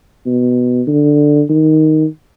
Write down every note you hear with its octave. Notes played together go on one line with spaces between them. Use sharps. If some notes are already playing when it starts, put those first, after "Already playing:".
B2
D3
D#3